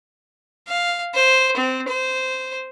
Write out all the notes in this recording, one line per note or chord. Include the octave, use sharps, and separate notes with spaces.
F5
C5
C4
C5